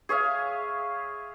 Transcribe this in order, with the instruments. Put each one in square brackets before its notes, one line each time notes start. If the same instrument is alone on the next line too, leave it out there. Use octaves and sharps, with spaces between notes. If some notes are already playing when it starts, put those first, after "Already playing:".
[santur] G#4 C#5 E5 F5